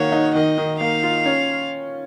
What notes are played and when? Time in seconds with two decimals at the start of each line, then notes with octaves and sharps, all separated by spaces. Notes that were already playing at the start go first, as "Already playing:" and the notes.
Already playing: D#3 A#3 F#4 C#5
0.12 D#4
0.35 D#3 D#5
0.58 D#3
0.80 A#3 F5
1.03 F4
1.26 C#4